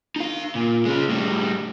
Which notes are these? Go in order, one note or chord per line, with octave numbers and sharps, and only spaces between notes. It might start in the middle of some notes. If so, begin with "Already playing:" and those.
D#4 F5
A#2
G#3 C#4
A2 G3